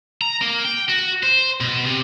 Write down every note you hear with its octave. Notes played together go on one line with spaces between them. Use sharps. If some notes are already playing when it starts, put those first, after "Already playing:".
A#5
A#3
G5
F#4
C5
B2
C3